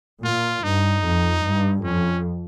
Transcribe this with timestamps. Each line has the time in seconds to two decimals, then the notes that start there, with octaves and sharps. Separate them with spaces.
0.24 A#2 F4
0.63 G2 D#4
1.04 F2
1.44 G2
1.84 F2 C#4